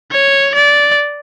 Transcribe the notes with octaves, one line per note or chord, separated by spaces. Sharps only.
C#5
D5